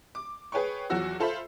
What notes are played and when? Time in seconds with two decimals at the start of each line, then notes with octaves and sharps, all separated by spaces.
0.15 D6
0.52 G#4 B4 C#5 G5 C#6
0.90 E2 F3 F#3 F#4 E6
1.20 F4 A4 C5 E5 B5